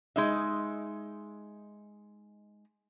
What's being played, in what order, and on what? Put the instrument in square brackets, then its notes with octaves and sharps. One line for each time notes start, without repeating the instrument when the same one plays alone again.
[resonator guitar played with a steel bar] G#3 D#4 E5